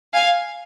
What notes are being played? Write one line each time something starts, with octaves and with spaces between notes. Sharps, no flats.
F5 G#5